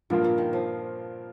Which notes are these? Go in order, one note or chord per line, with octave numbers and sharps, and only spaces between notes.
G2 A#2 F3 A#3 F4
A#2
D#3
F3